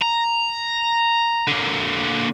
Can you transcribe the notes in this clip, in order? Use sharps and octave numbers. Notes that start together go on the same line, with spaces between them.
A#5
D3 A#3